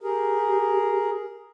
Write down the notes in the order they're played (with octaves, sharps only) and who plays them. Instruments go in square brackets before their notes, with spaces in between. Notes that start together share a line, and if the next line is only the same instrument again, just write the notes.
[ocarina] G4 [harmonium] G#4 A#4